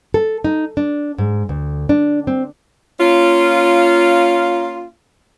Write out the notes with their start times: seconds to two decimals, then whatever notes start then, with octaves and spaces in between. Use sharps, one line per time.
0.14 A4
0.44 D#4
0.77 D4
1.18 G#2
1.49 D2
1.89 D4
2.27 C4
3.00 A#3 C#4 F4